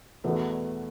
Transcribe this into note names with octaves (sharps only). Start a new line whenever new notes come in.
E2 B2 A3 B3